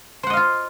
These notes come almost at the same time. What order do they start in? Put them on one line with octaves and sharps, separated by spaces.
C5 F#5 D#5 F5 F4